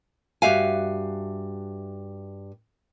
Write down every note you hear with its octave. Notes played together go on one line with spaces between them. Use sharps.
G2 F#4 G4 E5 F5 G#5